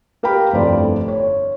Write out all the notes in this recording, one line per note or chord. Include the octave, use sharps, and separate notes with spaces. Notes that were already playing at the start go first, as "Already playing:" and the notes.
G4 A#4 F5 G5 B5
G1 F2 A2 A4 C5 D5
C#5